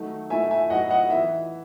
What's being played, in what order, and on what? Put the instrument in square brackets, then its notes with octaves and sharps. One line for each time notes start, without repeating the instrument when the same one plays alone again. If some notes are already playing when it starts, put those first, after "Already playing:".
Already playing: [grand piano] D#3 F#3 A3 D#4
B2 A3 E4 E5 G#5
E5 G#5
A2 F#3 B3 D#4 D#5 F#5
D#5 F#5
E3 B3 E4 E5